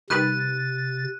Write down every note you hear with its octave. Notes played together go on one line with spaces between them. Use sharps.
C3 D#3 G3 B4 F#6 A6 D#7